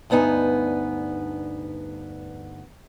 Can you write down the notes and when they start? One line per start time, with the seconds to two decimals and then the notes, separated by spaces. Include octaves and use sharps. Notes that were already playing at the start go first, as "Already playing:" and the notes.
0.10 D2 G2 B3 D#4 G#5